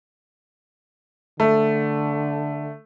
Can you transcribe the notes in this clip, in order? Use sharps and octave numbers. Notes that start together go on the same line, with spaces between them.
D3 A3